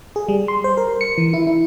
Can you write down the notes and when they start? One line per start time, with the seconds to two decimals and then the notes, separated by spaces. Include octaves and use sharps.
0.16 G#4
0.28 G3
0.48 C6
0.64 C5
0.77 A#4
1.01 C#7
1.18 E3
1.33 E4
1.47 E4